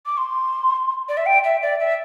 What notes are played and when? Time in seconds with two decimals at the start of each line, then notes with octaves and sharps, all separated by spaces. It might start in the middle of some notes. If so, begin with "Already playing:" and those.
0.06 D6
0.17 C6
1.08 D5
1.17 E5
1.26 G5
1.43 E5
1.62 D5
1.79 E5